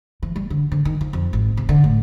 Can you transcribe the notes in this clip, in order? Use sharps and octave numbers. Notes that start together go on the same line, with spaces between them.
E3
G3
D3
D3
D#3
F3
F2
G#1
C3
D3
A2